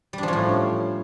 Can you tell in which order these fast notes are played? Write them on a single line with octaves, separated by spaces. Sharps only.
G3 D4 F3 C#4 A2